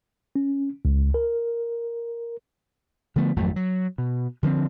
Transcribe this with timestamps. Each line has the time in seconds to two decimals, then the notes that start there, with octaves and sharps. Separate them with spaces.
0.35 C#4
0.85 C#2
1.14 A#4
3.16 D3 F3 A3 B3
3.36 G#1 F2 F#3 A3
3.56 F#3
3.98 B2
4.43 D3 F3 G3 C4